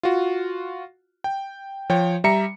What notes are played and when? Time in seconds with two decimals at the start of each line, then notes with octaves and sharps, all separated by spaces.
0.03 F4 F#4
1.24 G5
1.90 F3 C#5 G5
2.24 G3 E5 A#5 C#7